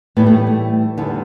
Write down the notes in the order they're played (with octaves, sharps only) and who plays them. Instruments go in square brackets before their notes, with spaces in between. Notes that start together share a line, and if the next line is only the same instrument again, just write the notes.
[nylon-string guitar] A2 E3 G3 B3
A3
B3
A3
E2 D3 G3 B3